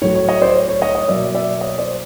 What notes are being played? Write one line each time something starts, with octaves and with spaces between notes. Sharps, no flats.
A2 F#3 A3 C#5
C#5
C#5 D#5
C5 D5
C#5
C#5
C#5 D#5
C#5 D#5
B2 F#3 A#3 D5 E5
D5 E5
C#5 D#5
C5 D5